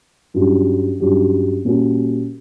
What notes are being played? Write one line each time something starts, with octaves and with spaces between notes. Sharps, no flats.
G2 F#3 C#4 E4 G4
G2 F#3 C#4 E4 G4
A#2 G3 A#3 C#4 F#4